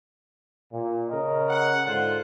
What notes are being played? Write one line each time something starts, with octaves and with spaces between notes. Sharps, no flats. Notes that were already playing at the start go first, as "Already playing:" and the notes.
A#2
C#3 A#4 D#5
F#5
G#2 D3 F4 C5 F#5